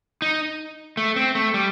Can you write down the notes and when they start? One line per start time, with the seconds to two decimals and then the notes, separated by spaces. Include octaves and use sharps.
0.22 D#4
0.97 A3
1.16 C4
1.35 A3
1.54 G3